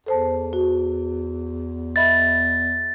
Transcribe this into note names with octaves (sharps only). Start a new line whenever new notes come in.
E2 A4 C5 A5
F#4
D#5 E5 B5 A6